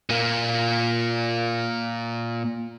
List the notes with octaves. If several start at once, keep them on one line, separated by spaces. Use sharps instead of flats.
A#2 A#3